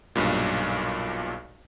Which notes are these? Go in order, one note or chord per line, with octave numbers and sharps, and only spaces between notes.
B1 G2 A#2